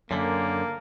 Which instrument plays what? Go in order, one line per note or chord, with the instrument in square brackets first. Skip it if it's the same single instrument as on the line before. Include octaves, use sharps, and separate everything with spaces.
[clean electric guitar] F#2 D3 [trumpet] A#3